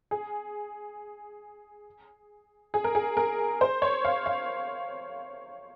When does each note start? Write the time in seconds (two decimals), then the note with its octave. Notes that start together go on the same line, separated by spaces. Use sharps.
0.11 G#4
2.74 G#4
2.84 A#4
2.95 G#4
3.17 A#4
3.61 C5
3.82 C#5
4.05 F5
4.26 F5